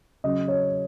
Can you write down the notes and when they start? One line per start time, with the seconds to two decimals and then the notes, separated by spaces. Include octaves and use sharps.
0.24 C#3 F#3 D#5
0.48 C#5